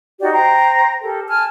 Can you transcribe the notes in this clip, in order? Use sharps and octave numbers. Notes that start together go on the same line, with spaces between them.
D#4 F#4 G4 D5
C5 G5 A#5
G4 A4 A#4
G#5 A5 F6